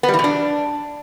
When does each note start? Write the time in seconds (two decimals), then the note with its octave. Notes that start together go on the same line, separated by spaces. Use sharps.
0.03 B3
0.08 G3
0.14 E3
0.19 B2
0.24 D4